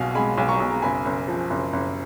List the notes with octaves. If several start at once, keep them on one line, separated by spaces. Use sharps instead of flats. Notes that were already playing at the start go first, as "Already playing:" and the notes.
Already playing: B1 B2 F5 F#5 G#5
G#3 G#5 B5
B1
A#5 C#6
B1
A#5
F#1 G#5 B5
F#1
F3
F#1
F#1